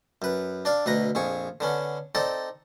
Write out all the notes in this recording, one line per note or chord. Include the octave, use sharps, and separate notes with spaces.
F#2 B4
D4 D5 F5
D2 B2 B4 A#5
A#1 F2 G#4 C#6
D3 B3 C#4
C4 D#4 A4 D5